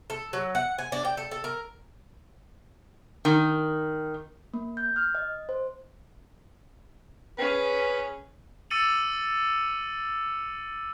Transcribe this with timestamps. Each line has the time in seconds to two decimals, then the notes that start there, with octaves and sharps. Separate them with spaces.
0.10 A4
0.33 F#3
0.55 F#5
0.79 G#5
0.92 D4
1.05 G5
1.17 A4
1.31 A4
1.44 A#4
3.25 D#3
4.54 A#3
4.77 G6
4.96 F6
5.15 D#5
5.49 C5
7.38 C#4 G#4 B4
8.70 D6 E6 A6 C#7 D#7 F#7